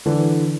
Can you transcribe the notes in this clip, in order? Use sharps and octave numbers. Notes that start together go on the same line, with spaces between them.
D3 E3